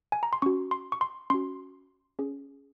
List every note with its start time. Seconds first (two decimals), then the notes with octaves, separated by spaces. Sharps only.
0.12 G#5
0.23 A#5
0.33 C6
0.42 C#4 F#4 C#6
0.71 C6
0.92 C#6
1.01 C6
1.30 C#4 F#4 C6
2.19 C#4 G#4